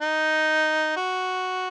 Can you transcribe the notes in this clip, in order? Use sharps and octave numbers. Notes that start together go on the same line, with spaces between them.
D#4
F#4